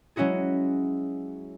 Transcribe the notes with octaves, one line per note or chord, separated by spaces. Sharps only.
F#3 G#3 C#4 E4 F#4 G#4